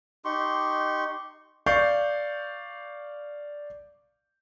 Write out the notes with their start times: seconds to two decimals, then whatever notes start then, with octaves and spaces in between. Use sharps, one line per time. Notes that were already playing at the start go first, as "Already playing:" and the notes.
0.25 D#4 G4 C6 C#6
1.66 D5 F5 C#6 G6